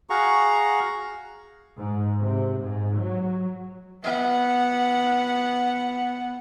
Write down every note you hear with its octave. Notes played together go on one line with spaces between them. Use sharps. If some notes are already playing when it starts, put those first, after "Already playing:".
F#4 G#4 F5 F#5 A#5 C#6
G#2
C3
G#2
F#3
B3 F#5